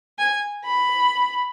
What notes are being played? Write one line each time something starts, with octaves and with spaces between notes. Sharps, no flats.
G#5
B5